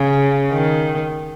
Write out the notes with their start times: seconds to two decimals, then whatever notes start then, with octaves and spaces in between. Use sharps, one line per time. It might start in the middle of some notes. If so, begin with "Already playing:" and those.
Already playing: C#3
0.52 D#3